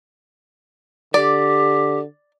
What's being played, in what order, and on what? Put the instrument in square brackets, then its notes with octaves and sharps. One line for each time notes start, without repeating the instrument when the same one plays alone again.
[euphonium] D3 [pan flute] G4 [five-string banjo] D5